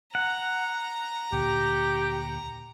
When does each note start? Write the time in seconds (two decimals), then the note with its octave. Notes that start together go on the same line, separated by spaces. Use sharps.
0.15 F#5 A#5
1.32 D2 A#2 G4